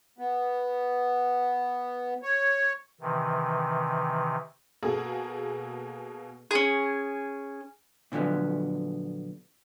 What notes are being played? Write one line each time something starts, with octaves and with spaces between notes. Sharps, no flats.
B3
C#5
C3 D#3 E3
B2 A#3 G#4 A4
C#4 G#4
A#2 D3 F3 F#3 B3